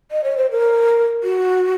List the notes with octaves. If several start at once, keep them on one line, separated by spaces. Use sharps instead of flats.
D#5
C#5
C5
A#4
F#4